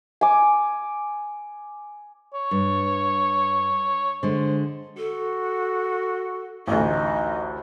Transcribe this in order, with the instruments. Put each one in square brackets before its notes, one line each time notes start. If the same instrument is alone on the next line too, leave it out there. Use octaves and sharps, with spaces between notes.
[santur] G#5 D6
[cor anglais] C#5
[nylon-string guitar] G2
[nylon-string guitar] D3 G#3 [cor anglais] C5
[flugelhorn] F#4 [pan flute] A4
[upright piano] A1 D2 [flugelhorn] D#4 [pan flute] D#5